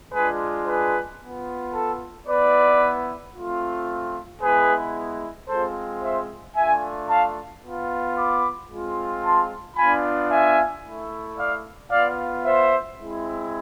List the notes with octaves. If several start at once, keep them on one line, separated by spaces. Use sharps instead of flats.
G#3 D4 F4 G#4 B4
G#4 B4
B3 F4
A4
B3 E4 B4 D5
A3 C4 F4
G#3 B3 E4 G#4 B4
G#3 C4 F4 A4 C5
C5 E5
A3 D4 F4 E5 G#5
F5 A5
B3 F4
B5 D6
G#3 C4 F4
A5 C6
B3 D4 F4 G#5 B5
E5 G#5
A3 E4
D5 F5
B3 F4 D5 F5
C5 E5
G#3 C4 E4